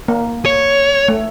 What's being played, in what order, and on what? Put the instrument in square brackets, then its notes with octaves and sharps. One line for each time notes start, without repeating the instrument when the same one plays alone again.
[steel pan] A#3
[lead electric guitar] C#5
[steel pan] A3